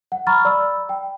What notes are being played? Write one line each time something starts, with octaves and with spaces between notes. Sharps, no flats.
F#5
A#5 B5 C#6 F6 A6
D5 B5 E6
G5